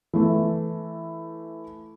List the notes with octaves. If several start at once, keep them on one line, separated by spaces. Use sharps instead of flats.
E3 A3